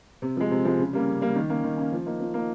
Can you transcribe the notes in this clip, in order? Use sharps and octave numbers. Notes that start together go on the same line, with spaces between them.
C3
F3 G#3
C3
F3 G#3
C#3
G3 A#3 C#4
C#3
G3 A#3 C#4
D#3
A#3 C#4
D#3
A#3 C#4
F3
A#3 D#4
F3
A#3 D#4